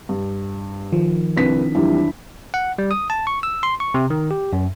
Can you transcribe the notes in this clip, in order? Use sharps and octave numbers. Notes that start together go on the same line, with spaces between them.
G2
D#3 F3
C2 C4 D4 B4 B6
F2 E3 F#3 G3 D4 E4
F#5
G3
D#6
A5
C#6
E6
C6
C#6
C3
D#3
G4
F#2